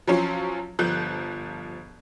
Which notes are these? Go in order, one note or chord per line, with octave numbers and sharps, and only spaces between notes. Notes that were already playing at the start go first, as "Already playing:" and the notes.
F3 F#3 C#4 F4
G1 F3 F#6 G6